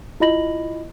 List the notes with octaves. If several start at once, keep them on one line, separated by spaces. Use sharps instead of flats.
E4 F4 D#5 B5 A#6 F#7